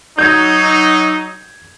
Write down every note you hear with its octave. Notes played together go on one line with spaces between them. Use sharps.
F#3 D#4 G6 G#6